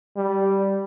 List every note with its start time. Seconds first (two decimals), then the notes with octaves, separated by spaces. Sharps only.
0.17 G3